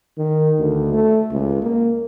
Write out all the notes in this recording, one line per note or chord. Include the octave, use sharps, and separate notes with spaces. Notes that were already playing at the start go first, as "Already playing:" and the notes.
D#3
D2
A3
C#2
A#3